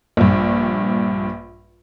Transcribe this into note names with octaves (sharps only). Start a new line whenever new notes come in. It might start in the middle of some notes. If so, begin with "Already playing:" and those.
A#1 G2